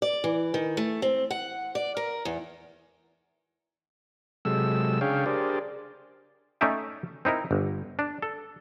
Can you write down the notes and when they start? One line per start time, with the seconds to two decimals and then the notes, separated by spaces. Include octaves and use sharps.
0.02 D5
0.24 E3
0.54 D#3
0.77 A3
1.02 C4
1.31 F#5
1.75 D5
1.97 A#4
2.25 E2
4.45 C3 F#3 G#3 A4 E6
5.01 C#3 D4 G#4 C#5 F5 G5
5.26 D4 G4 G#4 A#4 C5 D5
6.61 A3 C#4 D#4 D5 E5 G5
7.25 C4 D#4 E4 A#4
7.51 G1
7.99 D4
8.22 A4